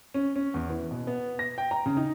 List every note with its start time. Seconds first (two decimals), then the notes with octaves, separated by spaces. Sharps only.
0.14 C#4
0.36 C#4
0.54 E2
0.70 E3
0.91 B2
1.07 B3
1.39 A#6
1.58 G5
1.71 A#5
1.86 C#3
1.97 D#4